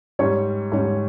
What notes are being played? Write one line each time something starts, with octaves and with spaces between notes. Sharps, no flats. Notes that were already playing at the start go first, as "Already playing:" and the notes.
G#2 G3 C#4 C#5
G#2 G3 C#4